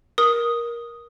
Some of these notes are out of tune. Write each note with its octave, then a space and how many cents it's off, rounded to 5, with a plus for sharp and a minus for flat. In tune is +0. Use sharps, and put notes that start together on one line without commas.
A#4 +15 D#6 +0